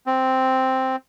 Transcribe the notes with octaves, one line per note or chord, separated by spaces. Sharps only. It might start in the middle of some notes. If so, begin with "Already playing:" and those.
C4